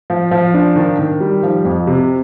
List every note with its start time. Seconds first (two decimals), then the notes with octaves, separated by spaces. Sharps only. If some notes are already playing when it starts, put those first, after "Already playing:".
0.10 F3
0.31 F3
0.54 D4
0.76 D#3
0.99 D#3
1.20 G3
1.43 F3
1.65 F2
1.87 C3